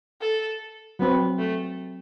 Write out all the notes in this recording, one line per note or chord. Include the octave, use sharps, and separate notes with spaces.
A4
F#3 B3 C4 F#4
A3